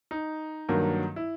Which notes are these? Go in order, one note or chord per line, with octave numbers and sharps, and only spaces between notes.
D#4
G2 D#3 F#3 A#3
E4